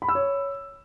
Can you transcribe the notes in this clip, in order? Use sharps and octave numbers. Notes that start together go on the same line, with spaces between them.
B5
E6
C#5